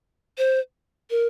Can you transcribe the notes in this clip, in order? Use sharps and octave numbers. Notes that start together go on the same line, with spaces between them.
C5
A#4